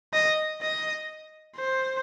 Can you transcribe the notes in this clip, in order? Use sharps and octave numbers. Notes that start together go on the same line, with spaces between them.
D#5
D#5
C5